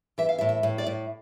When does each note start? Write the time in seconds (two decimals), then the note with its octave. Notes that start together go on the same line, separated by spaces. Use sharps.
0.18 E3 E5
0.29 F5
0.38 E5
0.41 A2
0.49 E5
0.63 A2
0.78 D5
0.87 A2